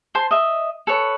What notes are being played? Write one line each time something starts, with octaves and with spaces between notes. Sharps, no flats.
C5 A5 C6
D#5 E5
A4 B4 C#5